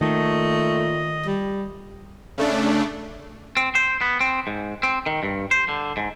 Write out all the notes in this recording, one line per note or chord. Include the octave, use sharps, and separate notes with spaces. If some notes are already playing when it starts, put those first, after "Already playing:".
A#2 D#3 A3 D#5
G3
C#3 A3 D4
C4
C5
B3
C4
G#2
C4
D#3
G2
C5
D3
G#2